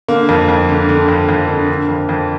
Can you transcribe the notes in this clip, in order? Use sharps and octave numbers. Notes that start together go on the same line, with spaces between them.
D3 A#3
F2
F2
D3
D3
F2
F2
D3
D3
F2
F2